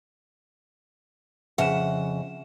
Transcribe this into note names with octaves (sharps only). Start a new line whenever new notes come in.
F2 C#3 E5 F#5 E7